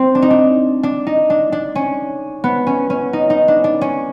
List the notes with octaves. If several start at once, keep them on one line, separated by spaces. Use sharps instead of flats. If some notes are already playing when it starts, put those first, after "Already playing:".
Already playing: C4
D4
D#4
D4
D4
D#4
D4
D4
C#4
B3
C#4
C#4
D#4
D#4
D4
D4
C#4